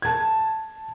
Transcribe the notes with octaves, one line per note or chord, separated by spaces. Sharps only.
A5 G#6